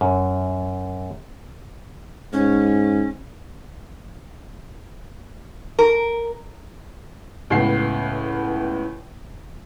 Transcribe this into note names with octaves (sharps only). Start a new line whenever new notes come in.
F#2
G#2 C#4
A#4
C#2 A2 B3 C7